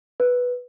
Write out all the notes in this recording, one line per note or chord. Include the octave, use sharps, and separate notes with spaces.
B4